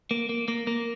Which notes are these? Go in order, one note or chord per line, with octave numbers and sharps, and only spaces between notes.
A#3
A#3
A#3
A#3